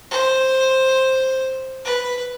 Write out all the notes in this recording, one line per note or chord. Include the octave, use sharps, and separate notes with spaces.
C5
B4